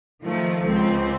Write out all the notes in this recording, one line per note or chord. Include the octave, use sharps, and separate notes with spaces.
D#3 F3 A3
C#2 C4